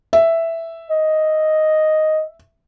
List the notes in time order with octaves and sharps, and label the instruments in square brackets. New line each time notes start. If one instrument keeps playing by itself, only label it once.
[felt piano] E5
[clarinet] D#5